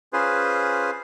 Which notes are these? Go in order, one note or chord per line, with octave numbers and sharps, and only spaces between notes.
C#4 F4 G#4 B4 C5